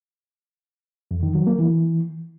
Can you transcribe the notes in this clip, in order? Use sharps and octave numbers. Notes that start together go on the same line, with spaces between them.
F2
D#3
F#3
A#3
E3